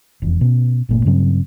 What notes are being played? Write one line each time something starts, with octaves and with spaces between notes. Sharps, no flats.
F1 E2
B2 C#4
G1 A#2 A3
G2 C#3 F#3 C4